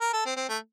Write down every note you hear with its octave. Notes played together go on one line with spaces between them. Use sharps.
A#4
A4
C4
C4
A3